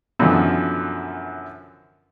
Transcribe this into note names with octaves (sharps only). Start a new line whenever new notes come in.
F#2 B2 D3 E3 F3